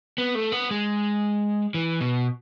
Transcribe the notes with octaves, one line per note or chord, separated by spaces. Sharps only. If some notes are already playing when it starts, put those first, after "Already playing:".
B3
A3
B3
G#3
E3
B2